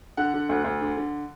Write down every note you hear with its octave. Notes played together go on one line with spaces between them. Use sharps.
D3 F#5
D3
D2
D2
D3
D3